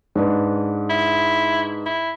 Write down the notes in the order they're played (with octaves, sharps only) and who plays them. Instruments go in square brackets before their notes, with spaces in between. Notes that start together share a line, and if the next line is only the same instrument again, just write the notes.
[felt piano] G#2 D4 B4
[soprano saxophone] E4
E4